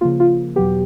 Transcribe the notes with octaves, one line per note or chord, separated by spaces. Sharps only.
C#3 F3 A#3 F4
F4
E2 B2 F#3 B3 G4